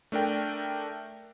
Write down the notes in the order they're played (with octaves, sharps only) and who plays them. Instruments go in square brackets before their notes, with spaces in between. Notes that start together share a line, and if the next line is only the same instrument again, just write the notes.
[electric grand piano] A3 D4 A#4 G5